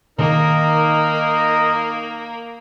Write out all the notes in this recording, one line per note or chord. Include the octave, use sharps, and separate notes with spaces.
D#3 A#3 D#4 A#4